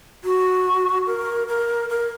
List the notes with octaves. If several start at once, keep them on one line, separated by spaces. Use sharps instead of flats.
F#4
A#4
A#4
A#4